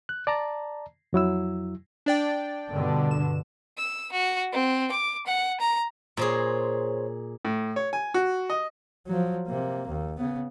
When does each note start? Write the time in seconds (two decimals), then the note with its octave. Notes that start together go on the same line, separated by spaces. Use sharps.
0.09 F#6
0.27 D5 A5 A#5
1.13 F2 F#3 E4 E6
2.06 D4 D5 G5
2.69 G2 B2 D3
3.11 E7
3.77 E6
4.12 F#4
4.51 C4
4.91 D6
5.26 F#5
5.59 A#5
6.17 A#2 G#3 G#4 C5 C#5
7.45 A2
7.76 C#5
7.93 G#5
8.14 F#4
8.50 D#5
9.07 F3 F#3
9.47 C3 A#3
9.88 D#2
10.18 C#3 B3